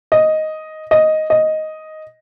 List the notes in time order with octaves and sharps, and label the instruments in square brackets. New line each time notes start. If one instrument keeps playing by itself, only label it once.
[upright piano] D#5
D#5
D#5